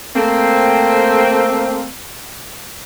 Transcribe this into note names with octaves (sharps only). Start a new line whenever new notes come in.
A3 A#3 C4